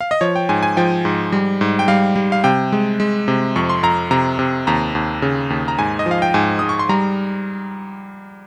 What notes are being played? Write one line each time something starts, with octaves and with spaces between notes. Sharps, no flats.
F5
D#5
F3 C#5
G5
G#2 G#5
G#5
F3 G5
G#2
G3
G#2
G5
G3 F5
G3
F5
C3 G5
G#3
G#3
C3
F2 C#6
C6
F2 A#5
C3 A#5
C3
D#2 A#5
D#2
C#3
D#2
A#5
G#2 G#5
D#5
F3
F5
G5
G#2 G#5
G#2 D#6
C#6
C6
G3 A#5